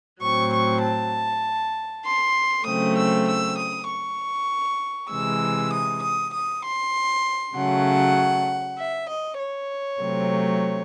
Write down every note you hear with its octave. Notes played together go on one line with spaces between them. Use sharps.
A2 F#3 C4 C#6
C#6
A5
C6
C#3 F#3 A3 C4 D#6
E6
E6
D#6
C#6
C3 E3 G#3 E6
D#6
D#6
D#6
C6
C#3 F#3 A3 F#5
E5
D#5
C#5
C3 F#3 A3 C4